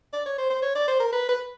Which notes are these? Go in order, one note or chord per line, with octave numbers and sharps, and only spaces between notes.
D5
C#5
C5
C5
C#5
D5
C5
A#4
B4
B4